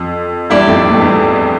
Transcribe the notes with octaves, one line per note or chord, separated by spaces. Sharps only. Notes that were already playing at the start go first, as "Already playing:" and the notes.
Already playing: F2
E2 G2 E4 G4 D5
F2 A2
G2
A2
E2 G2